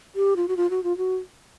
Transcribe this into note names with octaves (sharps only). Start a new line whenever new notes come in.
G4
F4
F#4
F4
F#4
F4
F#4